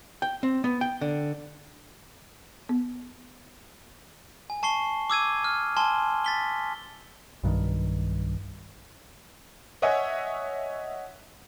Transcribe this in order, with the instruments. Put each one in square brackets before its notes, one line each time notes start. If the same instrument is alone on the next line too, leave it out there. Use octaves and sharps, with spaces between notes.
[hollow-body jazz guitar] G5
C4
B3
G5
D3
[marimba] B3
[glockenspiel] G#5
A5 C#6 C7 G7
D6 E6 G#6 D#7
F6
G#5 A5 C6 G7
A6 B6 G7
[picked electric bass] B1 G2 D#3
[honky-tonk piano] C#5 D#5 E5 F#5 G#5